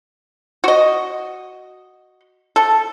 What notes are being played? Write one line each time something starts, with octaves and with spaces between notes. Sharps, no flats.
F#4 D#5
A4